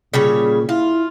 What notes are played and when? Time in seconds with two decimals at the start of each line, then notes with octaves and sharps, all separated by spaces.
0.13 A#2 C#3 G3 C#5
0.69 E4 F4